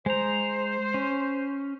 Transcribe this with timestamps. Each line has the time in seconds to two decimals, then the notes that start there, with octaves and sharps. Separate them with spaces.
0.06 G#3 C5 A#5
0.94 C#4